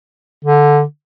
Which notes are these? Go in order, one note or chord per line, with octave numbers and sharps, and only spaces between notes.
D3